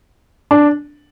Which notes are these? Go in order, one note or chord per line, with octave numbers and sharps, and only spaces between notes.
D4